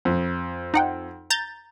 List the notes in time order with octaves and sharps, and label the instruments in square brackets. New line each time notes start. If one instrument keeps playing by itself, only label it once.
[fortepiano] F2
[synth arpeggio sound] D#4 F#5 G5
A#5 G6 A6